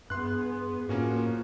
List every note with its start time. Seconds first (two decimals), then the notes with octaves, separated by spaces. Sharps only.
0.10 G2 B3 G#4 C6 F#6
0.89 A2 F3 A#3 C#4 F#4